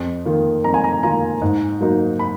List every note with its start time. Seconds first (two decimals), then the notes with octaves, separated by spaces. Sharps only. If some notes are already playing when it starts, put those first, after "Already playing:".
Already playing: F2
0.25 D#3 A#3 F4
0.64 F2 A#5
0.74 G#5
0.84 A#5
1.03 D#3 A#3 F4 A#5
1.42 G#2
1.81 F#3 A#3 D#4
2.19 B5